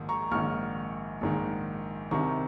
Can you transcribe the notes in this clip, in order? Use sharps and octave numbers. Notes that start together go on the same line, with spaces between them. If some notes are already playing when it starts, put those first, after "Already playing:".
Already playing: A#1 G#2 D#3
A#5 C#6
A#1 G#2 D#3 C#6 F6
A#1 G#2 D#3
C2 C3 D#3 A#5 C#6